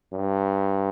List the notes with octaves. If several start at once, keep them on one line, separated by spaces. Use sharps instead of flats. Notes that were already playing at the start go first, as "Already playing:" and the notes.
G2